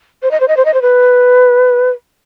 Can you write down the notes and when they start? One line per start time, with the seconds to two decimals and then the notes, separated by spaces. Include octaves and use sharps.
0.23 C5
0.31 D#5
0.40 C5
0.48 D#5
0.57 C5
0.65 D#5
0.74 C5
0.82 B4